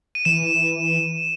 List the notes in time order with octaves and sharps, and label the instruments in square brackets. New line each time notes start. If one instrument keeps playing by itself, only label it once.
[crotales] D#7
[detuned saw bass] E3 [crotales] E7